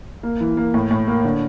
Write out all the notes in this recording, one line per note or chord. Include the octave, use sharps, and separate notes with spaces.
A#3
E3
A#3
A2
A2
A#3
D3